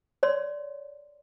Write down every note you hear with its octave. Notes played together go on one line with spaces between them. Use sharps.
C#5 D5 C6